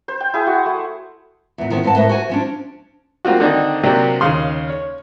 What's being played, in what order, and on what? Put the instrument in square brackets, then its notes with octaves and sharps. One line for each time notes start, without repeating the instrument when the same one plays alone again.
[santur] C5
G5
E4 G#4 G5
F#4
A3
[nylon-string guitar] E2 A#2
D#3 F3 A3 B3 C#4
G2 C4 B4 F#5 A5
A2 A3 A#4 B4 D#5
F#4 C5 G#5
F3 C#4 D4
[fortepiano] G3 A#3 C4 F4 F#4
D3 D#3 C4 D4 D#4
C3 F#3 A#3 C4 D4 G4
D#2 C#3 F5 C6
C#5